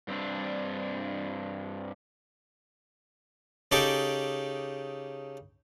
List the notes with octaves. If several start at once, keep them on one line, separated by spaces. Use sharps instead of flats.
G2 C4 D4
C#3 D#4 G4 A4 G#5 D6